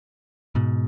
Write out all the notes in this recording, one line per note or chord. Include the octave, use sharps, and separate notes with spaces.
G#2 B2